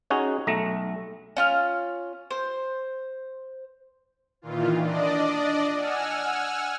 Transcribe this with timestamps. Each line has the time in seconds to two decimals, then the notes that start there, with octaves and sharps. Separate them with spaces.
0.10 C#4 D#4 F#4 G#4
0.47 B1 A3 A#5
1.37 C#4 F4 F6
2.31 C5
4.42 A#2 D#3 E3 F4
4.82 D4 D5 D#5
5.74 F#5 G#5 E6 F6